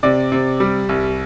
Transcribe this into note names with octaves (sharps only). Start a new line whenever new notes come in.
C3 D5
C3
G3
C2